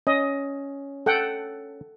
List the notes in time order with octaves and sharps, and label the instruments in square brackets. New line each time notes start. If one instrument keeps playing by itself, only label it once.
[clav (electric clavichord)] C#4 [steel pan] D#5
[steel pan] A4 F#5 G5